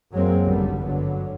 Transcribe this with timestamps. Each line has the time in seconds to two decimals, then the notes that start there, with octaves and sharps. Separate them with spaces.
0.12 F#2 F#3 G#3 A#3 C4
0.44 G#1 C#2 D3 G3 B3
0.81 G2 D3 F#3